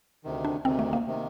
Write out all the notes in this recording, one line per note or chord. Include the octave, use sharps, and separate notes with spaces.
D2 C3 D#3
D4
D2 C3 D#3 C4
A3
A#3
C3 D#3